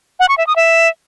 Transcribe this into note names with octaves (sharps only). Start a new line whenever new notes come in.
F#5
C#6
E5
D#6
E5